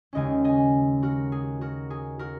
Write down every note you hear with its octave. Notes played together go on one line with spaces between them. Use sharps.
D#2 C#3 G#3 C#4 D#5 G#5
D#5 G#5
F#4 A#4
G#4
F#4 A#4
G#4
F#4 A#4